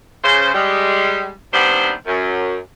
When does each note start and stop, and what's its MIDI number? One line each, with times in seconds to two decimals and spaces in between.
0.24 0.50 49
0.24 0.50 72
0.54 1.32 55
0.54 1.32 56
1.53 1.92 39
1.53 1.92 48
1.53 1.92 55
1.53 1.92 59
1.53 1.92 62
1.53 1.92 72
2.07 2.59 42